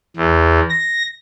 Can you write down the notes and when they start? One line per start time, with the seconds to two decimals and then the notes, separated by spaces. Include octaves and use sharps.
0.16 E2
0.70 A#6